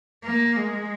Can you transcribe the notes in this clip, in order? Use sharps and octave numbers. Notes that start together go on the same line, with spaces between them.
A#3
G#3